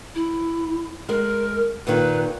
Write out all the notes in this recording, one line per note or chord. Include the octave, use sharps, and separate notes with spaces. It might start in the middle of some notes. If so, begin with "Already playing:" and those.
E4
G#3 A#4
A#2 D#3 B4